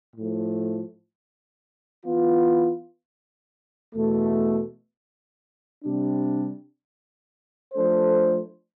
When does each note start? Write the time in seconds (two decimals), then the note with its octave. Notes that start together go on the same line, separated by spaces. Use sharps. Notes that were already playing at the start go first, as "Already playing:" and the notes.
0.16 A2 F3 A3
2.06 E3 B3 F4
3.95 E2 B2 A3
5.85 C3 G3 D4
7.73 F3 A3 D4 A4 C5